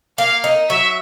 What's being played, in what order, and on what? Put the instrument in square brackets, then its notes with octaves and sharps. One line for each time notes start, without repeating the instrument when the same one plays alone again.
[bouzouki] A#3 [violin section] F5
[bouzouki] D#4
[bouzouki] F#3 [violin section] E5